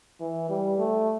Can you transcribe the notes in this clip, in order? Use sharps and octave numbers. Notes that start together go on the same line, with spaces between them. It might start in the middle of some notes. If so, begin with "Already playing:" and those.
E3
G3
A3